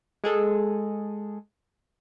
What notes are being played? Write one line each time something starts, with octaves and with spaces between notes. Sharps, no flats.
G#3 G#4 A4